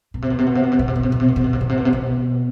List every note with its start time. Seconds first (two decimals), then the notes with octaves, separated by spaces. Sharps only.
0.14 B2
0.22 C3
0.30 B2
0.39 C3
0.46 B2
0.55 C3
0.63 B2
0.72 C3
0.79 B2
0.88 C3
0.96 B2
1.03 C3
1.12 B2
1.20 C3
1.28 B2
1.36 C3
1.44 B2
1.53 C3
1.61 B2
1.69 C3
1.77 B2
1.85 C3
1.93 B2